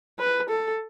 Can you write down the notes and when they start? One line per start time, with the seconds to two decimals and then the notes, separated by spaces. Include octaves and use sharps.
0.19 B4
0.49 A4